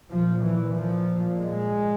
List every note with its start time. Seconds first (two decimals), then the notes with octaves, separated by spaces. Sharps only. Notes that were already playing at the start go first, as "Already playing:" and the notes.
0.10 A#2 F3
0.43 E3
0.75 F3
1.40 G#3